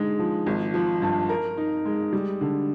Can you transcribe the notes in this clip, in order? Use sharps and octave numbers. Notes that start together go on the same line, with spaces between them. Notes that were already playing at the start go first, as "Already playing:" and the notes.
Already playing: D3 G#3 D#4
F3
G#1
F3
G2
A#4
D#4
G#3
G3
D3